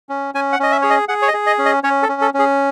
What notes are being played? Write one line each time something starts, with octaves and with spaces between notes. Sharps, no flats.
C#4
C#4 G#5
F#5
C#4 D#5
E5
G#4 C#5
D#5
G#4 F#5
C#5
D#5
G#4
D#5
C#4
D#5
C#4 C#5
A4
C#4
A4
C#4
G#4